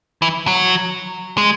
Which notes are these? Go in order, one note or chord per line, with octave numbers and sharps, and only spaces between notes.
E3
F#3
G#3